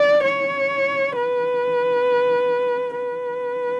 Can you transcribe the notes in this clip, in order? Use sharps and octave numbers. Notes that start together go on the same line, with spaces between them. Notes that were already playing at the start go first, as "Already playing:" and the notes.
Already playing: D5
C#5
B4
B4